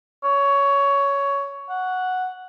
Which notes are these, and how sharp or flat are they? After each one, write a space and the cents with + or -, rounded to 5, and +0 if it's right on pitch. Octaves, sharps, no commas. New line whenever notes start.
C#5 +15
F#5 -5